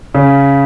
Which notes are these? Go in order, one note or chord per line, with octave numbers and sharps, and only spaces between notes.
C#3